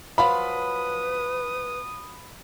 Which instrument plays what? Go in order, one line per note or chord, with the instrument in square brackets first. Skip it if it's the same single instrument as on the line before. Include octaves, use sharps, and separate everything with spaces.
[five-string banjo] F3 F#3 F4 [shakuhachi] B4 [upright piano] B5 [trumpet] D#6